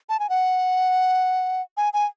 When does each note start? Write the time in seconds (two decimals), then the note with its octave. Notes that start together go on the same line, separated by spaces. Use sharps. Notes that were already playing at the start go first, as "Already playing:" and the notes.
0.09 A5
0.19 G#5
0.29 F#5
1.77 G#5
1.93 G#5